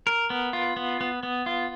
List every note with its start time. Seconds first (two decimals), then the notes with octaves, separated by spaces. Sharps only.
0.07 A#4
0.30 B3
0.53 F4
0.77 B3
1.01 B3
1.23 B3
1.46 F4